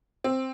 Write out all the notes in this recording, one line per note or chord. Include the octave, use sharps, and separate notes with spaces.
C4